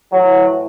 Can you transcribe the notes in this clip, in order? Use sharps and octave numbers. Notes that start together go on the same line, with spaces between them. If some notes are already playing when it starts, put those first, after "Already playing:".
A2 E3 F#3